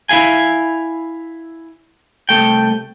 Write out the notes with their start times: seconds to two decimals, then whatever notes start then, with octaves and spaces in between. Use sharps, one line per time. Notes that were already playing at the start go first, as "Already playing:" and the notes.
0.09 E4 E5 F5 G#5
2.29 C2 A3 G5